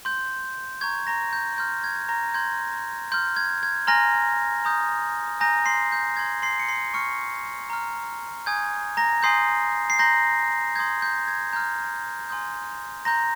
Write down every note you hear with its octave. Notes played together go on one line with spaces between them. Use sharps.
C6 G6
A#5 C#6 G6 G#6
A#5 A#6
G6
C6 F6 G6
G#6
A#5 A#6
C6 G6 G#6
C6 F6 G6
G#6
G#6
G#5 A#5 C6 F6 A#6
A#5 D#6 G6
G#5 A#5 D#6 G6 A#6
C6 C7
G6
C6 G6 G#6
C6 C7
C#7
C6 C7
C6 C#6 F6 C#7
A#5 F6
G#5 D#6 G6 G#6
A#5 A#6
G#5 C6 D#6 G6 C7
C7
A#5 C6 G6 A#6
C6 D#6 G6 G#6
G6
G#6
A#5 F6 G6
G#5 C6 D#6 G6
A#5 C6 G6 A#6